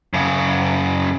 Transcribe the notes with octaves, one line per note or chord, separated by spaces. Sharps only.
F#2 C#3